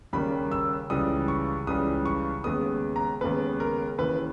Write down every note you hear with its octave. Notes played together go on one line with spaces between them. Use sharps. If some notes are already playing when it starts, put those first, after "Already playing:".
D#2 C#3 G3 A#3 B5
E6
C#2 C#3 E3 G3 D#6
C#6
C#2 C#3 E3 G3 D#6
C#6
D#2 C#3 G#3 B3 D#6
A#5
D#2 C#3 G#3 B3 B4
A#4
D#2 C#3 E3 B4